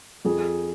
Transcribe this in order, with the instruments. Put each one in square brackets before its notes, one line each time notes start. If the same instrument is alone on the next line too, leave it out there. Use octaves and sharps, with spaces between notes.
[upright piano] F2 G#4